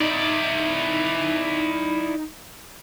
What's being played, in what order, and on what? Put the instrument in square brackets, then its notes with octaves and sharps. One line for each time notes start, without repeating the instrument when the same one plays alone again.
[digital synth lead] D#4 [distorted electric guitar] E4 D5